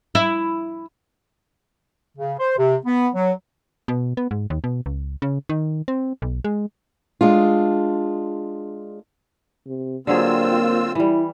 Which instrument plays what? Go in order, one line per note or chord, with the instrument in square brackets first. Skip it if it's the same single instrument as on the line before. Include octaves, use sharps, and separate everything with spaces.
[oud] E4
[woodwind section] C#3
C5
C3
B3
F#3
[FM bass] B2
B3
G#2
D#2
B2
C#2
C#3
D#3
C4
B1
G#3
[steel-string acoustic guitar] G#3 D4 F4
[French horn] C3
[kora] D3 F#3 G#4 [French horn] A#3 [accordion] C4 F4 E6
[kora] E3 G3 [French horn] E4